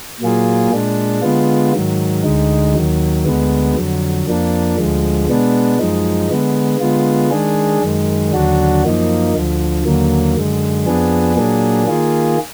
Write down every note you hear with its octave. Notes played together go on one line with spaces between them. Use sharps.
A#2 F#3 A#3 F4 G#4
A#2 G#3 D4
D3 G#3 B3 F4
G#2 D#3 F#3
D2 D3 G#3 D#4
D#2 D#3 F#3
D2 D3 G#3 B3
F2 D3 F#3
F2 F3 A#3 D4
D2 D3 F3 G#3
B2 G#3 B3 D4
F#2 F3 G#3 D#4
D3 G#3 B3
D3 G#3 B3 F4
D#3 G#3 D4 G#4
F#2 D#3 G#3
D#2 D3 F#3 D4 F#4
F#2 F3 A#3 D#4
D2 D3 F3
D#2 D3 F#3 A#3
F#2 D3 G#3
F2 F3 B3 D4 G#4
A#2 F#3 A#3 D4 G#4
D#3 A#3 F4 G#4